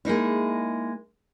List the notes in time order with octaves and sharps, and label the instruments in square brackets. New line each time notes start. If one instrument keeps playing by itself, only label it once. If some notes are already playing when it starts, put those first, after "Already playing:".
[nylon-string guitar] G#3 A#3 D#4 E4